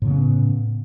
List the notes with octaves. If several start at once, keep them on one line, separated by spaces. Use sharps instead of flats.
A2 C#3 B3